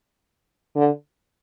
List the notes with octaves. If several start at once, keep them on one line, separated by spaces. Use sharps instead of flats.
D3